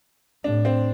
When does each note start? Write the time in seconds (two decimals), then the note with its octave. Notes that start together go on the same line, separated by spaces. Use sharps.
0.44 A2 D4
0.65 C4